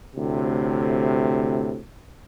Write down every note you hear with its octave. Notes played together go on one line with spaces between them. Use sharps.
D2 A2 C3